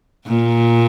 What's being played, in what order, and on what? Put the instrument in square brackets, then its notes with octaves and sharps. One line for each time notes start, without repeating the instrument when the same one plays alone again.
[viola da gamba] A#2